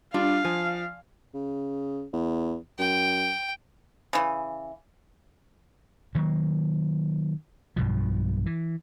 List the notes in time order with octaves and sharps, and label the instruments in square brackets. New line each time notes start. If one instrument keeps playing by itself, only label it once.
[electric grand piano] G3 F4 [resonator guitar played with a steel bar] D4 [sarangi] F5
[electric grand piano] F3 [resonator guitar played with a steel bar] G#5
[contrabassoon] C#3
E2
[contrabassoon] F#2 [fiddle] G5
[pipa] C#3 E3
[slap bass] D#3 F#3 A#3
B1 G2 B2 F3
E3